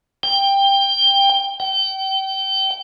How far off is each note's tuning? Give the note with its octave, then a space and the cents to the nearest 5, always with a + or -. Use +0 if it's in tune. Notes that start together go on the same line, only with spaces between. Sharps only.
G5 +15
G5 -30